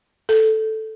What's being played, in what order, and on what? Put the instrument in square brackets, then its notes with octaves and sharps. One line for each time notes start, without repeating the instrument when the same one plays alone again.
[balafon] A4